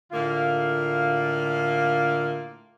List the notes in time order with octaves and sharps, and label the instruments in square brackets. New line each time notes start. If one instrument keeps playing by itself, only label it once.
[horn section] A2 D3 A#3 F4